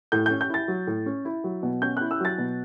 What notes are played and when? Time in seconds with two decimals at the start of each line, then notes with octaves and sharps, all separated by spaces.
0.12 A2 G6
0.26 C#4 G6
0.41 G6
0.50 E4 A6
0.68 F#3
0.87 A2
1.06 C#4
1.25 E4
1.44 F#3
1.63 B2
1.82 C#4 G6
1.97 E4 F#6
2.11 E6
2.20 F#3 A6
2.38 B2